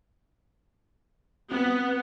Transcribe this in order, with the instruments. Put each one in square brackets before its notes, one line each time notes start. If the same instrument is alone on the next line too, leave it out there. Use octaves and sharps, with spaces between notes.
[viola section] B3 [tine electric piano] C4